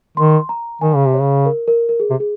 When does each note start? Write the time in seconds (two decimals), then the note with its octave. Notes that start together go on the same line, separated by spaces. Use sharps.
0.17 D#3 C6
0.49 A#5
0.81 D#3 G#5
0.95 C#3
1.07 C3
1.14 C#5
1.21 C#3
1.46 A#4
1.68 A#4
1.89 A#4
2.00 G#4
2.10 C3
2.20 G#4